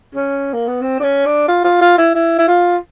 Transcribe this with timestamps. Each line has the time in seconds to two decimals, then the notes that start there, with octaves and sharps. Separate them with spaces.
0.15 C#4
0.54 A#3
0.68 B3
0.82 C4
1.00 D4
1.03 C#4
1.26 D4
1.48 F4
1.64 F4
1.81 F4
1.98 E4
2.15 E4
2.38 E4
2.48 F4